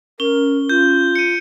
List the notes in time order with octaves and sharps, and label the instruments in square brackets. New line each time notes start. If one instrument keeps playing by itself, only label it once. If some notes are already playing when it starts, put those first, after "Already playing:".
[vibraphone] C#4 [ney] A#4 [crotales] G7
[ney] F4 [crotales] G6
[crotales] C#7 D#7